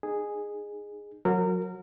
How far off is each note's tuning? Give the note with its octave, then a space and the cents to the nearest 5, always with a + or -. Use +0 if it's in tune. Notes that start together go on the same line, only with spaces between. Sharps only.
D#4 -30 G#4 -5
F#3 -25 F#4 -15 A#4 -25